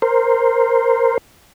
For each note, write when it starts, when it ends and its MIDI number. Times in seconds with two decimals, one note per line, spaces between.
0.02 1.18 70
0.02 1.18 72